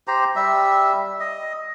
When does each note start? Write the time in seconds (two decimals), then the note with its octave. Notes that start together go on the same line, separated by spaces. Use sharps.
0.08 G4 C5 A#5
0.36 G3 E5
1.20 D#5